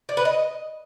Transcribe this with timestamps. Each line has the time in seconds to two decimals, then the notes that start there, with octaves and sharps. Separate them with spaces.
0.09 D5
0.17 B4
0.25 D#5